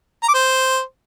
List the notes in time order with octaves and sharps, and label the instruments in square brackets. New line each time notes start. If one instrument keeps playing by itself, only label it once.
[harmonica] A#5
D6
C5